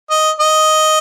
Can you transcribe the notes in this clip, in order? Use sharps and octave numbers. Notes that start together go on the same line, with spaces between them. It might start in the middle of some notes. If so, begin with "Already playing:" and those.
D#5
D#5